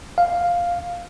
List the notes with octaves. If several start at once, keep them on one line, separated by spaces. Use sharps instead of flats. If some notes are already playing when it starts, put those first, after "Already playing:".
F5